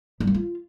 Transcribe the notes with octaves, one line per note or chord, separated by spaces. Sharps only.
G3
A#3
F4